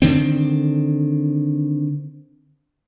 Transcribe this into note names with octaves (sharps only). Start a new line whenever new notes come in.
D3 D#3 C4